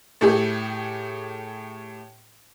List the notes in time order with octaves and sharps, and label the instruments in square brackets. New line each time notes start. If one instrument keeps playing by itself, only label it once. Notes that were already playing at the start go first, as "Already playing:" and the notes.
[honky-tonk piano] A2 A3 G4 G#4